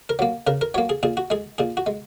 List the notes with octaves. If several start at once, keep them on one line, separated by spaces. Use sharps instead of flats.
A#4
F#3 A#3
C#3 A#4
A#4
F#3 A#3 C#5
G#4
A#2 G#4
F#4
G#3 G#4
A#2 G#4
F#4
G#3